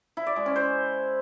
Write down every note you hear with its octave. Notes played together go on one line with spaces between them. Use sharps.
E4
D5
G#3
C#4
C5